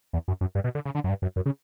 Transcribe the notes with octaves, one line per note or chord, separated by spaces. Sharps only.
E2
F#2
F#2
G2
B2
D3
C#3
D3
F#2
G2
F#2
F#2
C#3